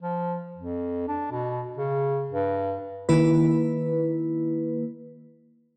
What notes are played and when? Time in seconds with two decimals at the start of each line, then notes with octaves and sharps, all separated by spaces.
0.02 F3
0.56 F2
1.08 D4
1.32 B2
1.78 C#3
2.30 G2
3.09 D#3 A#3 E4 B4